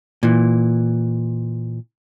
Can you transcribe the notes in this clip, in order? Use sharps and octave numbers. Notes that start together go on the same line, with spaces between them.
A#2 E3